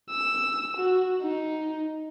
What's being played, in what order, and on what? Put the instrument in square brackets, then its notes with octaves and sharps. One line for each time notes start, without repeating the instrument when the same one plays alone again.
[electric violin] E6
F#4
D#4